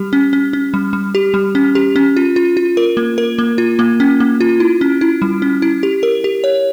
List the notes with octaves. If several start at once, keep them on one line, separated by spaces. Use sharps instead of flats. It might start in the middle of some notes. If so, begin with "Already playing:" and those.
Already playing: G3 G4
C#4
C#4
C#4
G3
G3
G4
G3
C#4
G4
C#4
F4
F4
F4
A#4
A#3
A#4
A#3
F4
A#3
C#4
A#3
F4
E4
C#4
E4
G3
C#4
E4
G4
A#4
G4
C#5